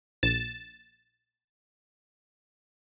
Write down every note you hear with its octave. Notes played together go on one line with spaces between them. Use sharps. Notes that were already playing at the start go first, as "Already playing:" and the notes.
A#1 A6 E7